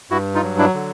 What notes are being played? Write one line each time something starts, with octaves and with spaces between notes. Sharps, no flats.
G2 E4 F#4
D#4 F4
F#3
D4 E4
D3